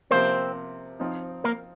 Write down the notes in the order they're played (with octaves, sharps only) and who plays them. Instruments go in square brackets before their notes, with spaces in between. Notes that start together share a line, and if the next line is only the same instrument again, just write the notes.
[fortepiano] C3 F3 A#3 [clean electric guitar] C4 C5
[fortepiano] F3 C4 D#4
[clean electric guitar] A#3 A#4